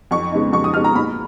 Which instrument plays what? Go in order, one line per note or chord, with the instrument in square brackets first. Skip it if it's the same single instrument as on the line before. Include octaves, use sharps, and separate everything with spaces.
[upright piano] F2 C#6
C#3 G#3 B3 D#4
F2 C#6
D#6
C#3 G#3 B3 D#4 F6
A#5
A#2 B5